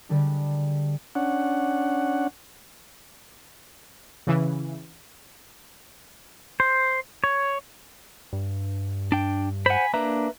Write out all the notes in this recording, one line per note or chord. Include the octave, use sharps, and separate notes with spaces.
D3 G3 G#3 D4
C#4 D4 F#5
C#3 E3
C5
C#5
G2
D4 G5
C5 F#5 G#5 B5
A#3 D4 B4 E5 A#5